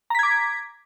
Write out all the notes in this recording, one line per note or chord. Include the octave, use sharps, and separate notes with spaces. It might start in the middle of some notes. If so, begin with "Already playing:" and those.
A#5 D6 G#6 B6